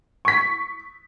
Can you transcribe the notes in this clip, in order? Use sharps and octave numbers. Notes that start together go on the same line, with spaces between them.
C#6 B6